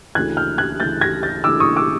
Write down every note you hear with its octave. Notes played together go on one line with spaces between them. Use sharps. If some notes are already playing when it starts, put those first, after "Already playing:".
D2 C#3 E3 F#6 G#6
F6 G6
F#6 G#6
D2 C#3 E3 G6 A6
G#6 A#6
G6 A6
D2 C#3 E3 D6 E6
C#6 D#6
D6 E6